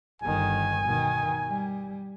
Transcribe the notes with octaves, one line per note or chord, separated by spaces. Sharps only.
G1 D#3 G#5
B2 D#3
G3